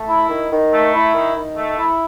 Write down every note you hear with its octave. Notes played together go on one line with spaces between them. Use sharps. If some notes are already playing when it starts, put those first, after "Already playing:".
Already playing: A3
E4
D#3
D#3
A3
E4
D#3
D#3
A3
E4